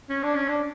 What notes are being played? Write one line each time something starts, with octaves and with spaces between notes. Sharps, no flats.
C#4
D4
C#4
D4